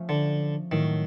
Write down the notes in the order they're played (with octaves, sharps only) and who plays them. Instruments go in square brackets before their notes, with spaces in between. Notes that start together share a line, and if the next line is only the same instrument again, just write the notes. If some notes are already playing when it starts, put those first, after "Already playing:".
Already playing: [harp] F3 A3 C#4
[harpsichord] D3
[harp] A2 F#3 A3 [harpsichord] D#3